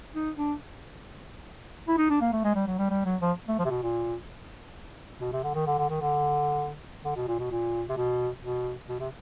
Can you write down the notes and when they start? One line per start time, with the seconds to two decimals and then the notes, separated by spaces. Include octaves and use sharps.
0.14 D#4
0.37 D4
1.88 E4
1.98 D#4
2.10 D4
2.21 A#3
2.32 A3
2.44 G#3
2.55 G3
2.67 F#3
2.78 G3
2.90 G3
3.05 F#3
3.21 F3
3.48 A3
3.59 F3
3.65 C3
3.70 B2
3.83 A#2
5.21 B2
5.33 C3
5.43 D3
5.55 D#3
5.67 D3
5.78 D3
5.90 D#3
6.01 D3
7.04 D3
7.16 B2
7.28 A#2
7.39 B2
7.51 A#2
7.89 C3
7.97 B2
8.43 B2
8.89 B2
9.00 C3